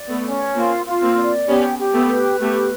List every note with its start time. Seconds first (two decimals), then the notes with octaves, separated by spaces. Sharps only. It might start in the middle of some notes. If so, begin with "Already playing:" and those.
Already playing: D5
0.08 A3 B3
0.25 C#4
0.55 A#3 C4 F4
0.86 F4
1.02 A#3 C4
1.17 D5
1.47 B3 C#4 G4
1.79 G4
1.94 A3 B3
2.09 B4
2.40 A3 B3 G4